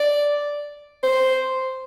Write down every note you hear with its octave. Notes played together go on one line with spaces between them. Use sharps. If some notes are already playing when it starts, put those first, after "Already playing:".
Already playing: D5
C5